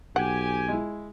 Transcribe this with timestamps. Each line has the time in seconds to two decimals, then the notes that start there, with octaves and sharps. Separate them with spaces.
0.16 B1 G4 F#5 G#5
0.68 G#3 E4